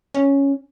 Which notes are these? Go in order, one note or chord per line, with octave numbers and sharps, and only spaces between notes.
C#4